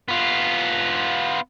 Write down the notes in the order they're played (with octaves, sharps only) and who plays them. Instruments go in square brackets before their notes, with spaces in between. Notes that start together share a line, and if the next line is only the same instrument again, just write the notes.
[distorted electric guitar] B3 F4